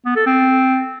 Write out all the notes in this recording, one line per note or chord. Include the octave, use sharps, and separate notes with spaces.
B3
A4
C4